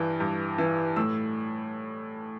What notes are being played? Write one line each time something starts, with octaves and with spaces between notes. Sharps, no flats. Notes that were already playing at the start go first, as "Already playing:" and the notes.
Already playing: G2 E3 A5
G2
E3
A2 E6